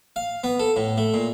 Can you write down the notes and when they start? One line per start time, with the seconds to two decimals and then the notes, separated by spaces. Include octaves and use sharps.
0.16 F5
0.44 B3
0.59 A4
0.76 A2
0.97 A3
1.14 A#2